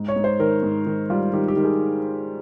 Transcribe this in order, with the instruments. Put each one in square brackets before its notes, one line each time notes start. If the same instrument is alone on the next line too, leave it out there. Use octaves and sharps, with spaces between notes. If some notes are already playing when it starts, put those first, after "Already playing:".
Already playing: [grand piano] G#2
C#5
G#2
C5
D#3 A#4
G#2
D#3
G3 F4
D#3 G4
G4
D#3
G#4